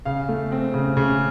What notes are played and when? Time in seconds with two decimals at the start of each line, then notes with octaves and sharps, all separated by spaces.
0.05 C#3 F5
0.29 A3
0.52 C4
0.74 C#3
0.97 C#3